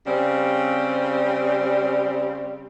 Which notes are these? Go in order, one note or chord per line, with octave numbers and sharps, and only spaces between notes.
C#3 G3 C4